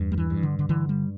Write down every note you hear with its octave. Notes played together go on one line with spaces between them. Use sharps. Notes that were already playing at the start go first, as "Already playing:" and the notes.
Already playing: E2 G2
G3
E3
G2
D3
D3
D3 E3
G3